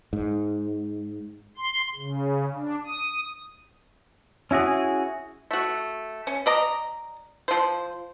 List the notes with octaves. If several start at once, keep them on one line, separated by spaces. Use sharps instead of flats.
G#2
C6
C#3
D4
D#6
C#4 E4 F#4 G#4
A3 F#4
C#4
D5 D#5 A#5
F3 C5